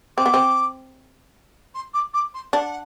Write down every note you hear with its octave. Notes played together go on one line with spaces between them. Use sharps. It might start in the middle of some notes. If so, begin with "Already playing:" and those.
C4 D6
B3
C4
C6
D6
D6
C6
D4 F#5